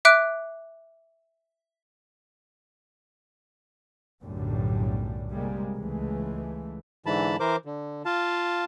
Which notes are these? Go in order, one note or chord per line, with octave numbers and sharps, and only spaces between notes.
E5 D6 F#6 D7
B1 F#2 A2 D3 G3
C3 G3 G#3 A#3
C#2 E3 G#3 A3
G#2 D3 E3 A5 B5
E3 A#4 C5 D6
D3
F4 F5 A5